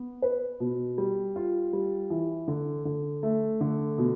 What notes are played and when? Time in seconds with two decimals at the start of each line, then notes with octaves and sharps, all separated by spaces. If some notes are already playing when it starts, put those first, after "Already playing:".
Already playing: B3
0.22 B4
0.60 B2
0.98 G3
1.36 F4
1.73 G3
2.10 E3
2.48 D3
2.85 D3
3.23 A3
3.61 D3
3.98 B2